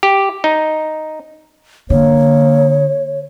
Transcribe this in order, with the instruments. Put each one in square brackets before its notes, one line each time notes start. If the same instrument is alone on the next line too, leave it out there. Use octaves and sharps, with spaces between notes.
[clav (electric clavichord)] G4
D#4
[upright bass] D3 [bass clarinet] A#3 [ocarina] C#5